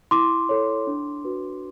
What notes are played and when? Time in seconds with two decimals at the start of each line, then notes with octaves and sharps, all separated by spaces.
0.11 E4 C6 D6
0.49 A4 C#5
0.87 D4
1.25 F#4 B4